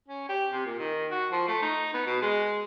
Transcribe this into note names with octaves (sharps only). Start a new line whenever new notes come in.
C#4
G4
C3
A#2
D#3
F#4
F3
A3
D#4
B3
B2
G#3